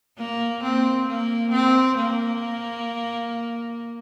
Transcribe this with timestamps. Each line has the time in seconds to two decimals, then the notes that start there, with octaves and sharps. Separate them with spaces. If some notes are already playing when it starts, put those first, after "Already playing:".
0.18 A#3
0.63 C4
1.07 A#3
1.52 C4
1.97 A#3